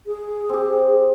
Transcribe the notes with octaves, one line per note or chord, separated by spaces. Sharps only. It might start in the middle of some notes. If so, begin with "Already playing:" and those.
G#4
C4 G4